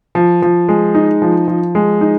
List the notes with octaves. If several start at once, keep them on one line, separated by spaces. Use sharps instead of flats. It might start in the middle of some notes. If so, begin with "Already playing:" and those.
F3
F3
G#3
D#4
F3
F3
G#3
D#4